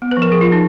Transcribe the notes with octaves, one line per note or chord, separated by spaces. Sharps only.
B3
B4
F3
A#4
F3 G#4
F4
F3
D#4